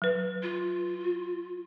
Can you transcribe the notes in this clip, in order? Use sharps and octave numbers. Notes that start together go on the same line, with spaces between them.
F#3 B4
F4